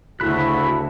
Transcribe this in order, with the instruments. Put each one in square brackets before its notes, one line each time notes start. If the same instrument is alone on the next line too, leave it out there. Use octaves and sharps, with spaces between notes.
[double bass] D2 C#3 [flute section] E4 F#4 [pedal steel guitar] A4 B5 F#6